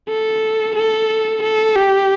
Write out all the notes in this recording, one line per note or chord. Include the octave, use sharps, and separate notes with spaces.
A4
A4
A4
G4